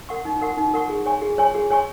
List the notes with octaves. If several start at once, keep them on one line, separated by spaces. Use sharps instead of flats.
A#4 F#5 C#6
D#4
A#4 F#5 C#6
D#4
A#4 F#5 C#6
G#4
C#5 G#5 C#6
G#4
C#5 G#5 C#6
G#4
C#5 G#5 C#6